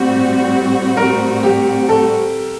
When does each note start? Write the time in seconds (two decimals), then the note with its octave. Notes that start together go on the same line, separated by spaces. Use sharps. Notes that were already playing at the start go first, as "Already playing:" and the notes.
Already playing: A2 G3 C4 F#4
0.97 A#4
1.43 G4
1.89 A4